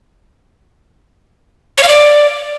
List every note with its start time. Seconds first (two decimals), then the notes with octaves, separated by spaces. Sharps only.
1.78 C#5
1.83 F5
1.89 D5